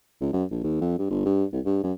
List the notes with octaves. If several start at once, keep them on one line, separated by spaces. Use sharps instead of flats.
C#2
F#2
A#1
D#2
F2
G2
G1
G2
C2
G2
F#2